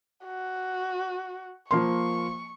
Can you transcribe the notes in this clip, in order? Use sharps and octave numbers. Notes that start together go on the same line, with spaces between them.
F#4
F3 A#3 C6 C#6